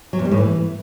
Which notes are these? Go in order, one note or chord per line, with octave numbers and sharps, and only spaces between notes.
F#3
E2
G3
A2
E3